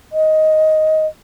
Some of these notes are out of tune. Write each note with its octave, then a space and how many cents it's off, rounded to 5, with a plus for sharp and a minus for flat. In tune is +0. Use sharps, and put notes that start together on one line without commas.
D#5 +5